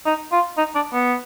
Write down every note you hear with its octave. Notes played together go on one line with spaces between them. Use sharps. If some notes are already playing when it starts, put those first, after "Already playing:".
D#4
F4
D#4
D4
B3